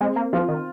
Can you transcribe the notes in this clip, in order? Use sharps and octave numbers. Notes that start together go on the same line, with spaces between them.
G#3 C4
A#3
F3 F4
D#3